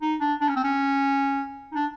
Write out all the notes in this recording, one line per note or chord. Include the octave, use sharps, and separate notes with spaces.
D#4
D4
D4
C#4
C4
C#4
D#4
D4